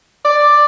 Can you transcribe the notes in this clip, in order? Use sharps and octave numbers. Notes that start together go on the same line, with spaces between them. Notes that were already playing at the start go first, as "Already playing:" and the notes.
D5